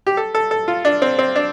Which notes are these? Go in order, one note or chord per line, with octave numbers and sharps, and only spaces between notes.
G4
A4
A4
A4
F4
D4
C4
C4
D4